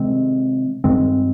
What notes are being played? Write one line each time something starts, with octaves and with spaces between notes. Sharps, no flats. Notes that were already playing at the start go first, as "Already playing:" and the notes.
Already playing: C3 D#3 G#3 C4
G2 D#3 G#3 C4